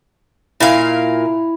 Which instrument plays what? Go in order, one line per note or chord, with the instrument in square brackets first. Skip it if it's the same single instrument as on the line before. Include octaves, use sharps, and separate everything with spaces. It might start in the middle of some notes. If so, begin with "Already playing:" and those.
[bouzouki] A#2 A#4 F5 [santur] E4